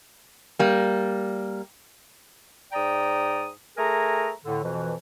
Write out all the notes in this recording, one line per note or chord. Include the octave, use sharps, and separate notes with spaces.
G3 A#3
G#2 D5 G5 A#5 D#6
A3 G#4 A#4 G#5 A#5
A2 D3
F2 B2 E3